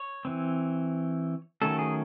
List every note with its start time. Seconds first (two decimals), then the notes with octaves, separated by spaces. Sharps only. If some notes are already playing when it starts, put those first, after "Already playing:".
Already playing: C#5
0.25 E3 C4
1.62 D#3 F#3 A3 C#4 A4
1.79 G#4